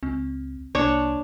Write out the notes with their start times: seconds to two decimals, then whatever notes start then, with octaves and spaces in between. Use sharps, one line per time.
0.03 C#2 C4
0.75 C2 A#3 D4 C#5 A5 E7